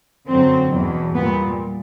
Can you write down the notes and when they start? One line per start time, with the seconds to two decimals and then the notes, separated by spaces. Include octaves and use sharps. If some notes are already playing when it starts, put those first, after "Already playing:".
0.28 F#2 D3 F#3 C4
0.71 E2 B2 F#3
1.14 A#2 G3 B3